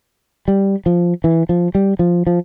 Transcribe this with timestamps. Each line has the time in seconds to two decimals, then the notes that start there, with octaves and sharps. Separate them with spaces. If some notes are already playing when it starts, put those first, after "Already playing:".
0.48 G3
0.86 F3
1.24 E3
1.49 F3
1.75 G3
1.99 F3
2.27 F3